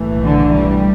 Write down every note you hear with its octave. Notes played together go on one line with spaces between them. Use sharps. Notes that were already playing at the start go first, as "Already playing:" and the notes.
Already playing: B1 A2 E3 A3
D3
G3